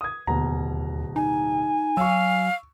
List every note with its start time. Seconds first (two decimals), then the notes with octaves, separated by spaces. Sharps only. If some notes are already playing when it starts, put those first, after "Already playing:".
0.01 D#6 G#6
0.27 D1 D#2 B2 A#5
1.16 D#4 G#5
1.97 F#3 F5 C#6 E6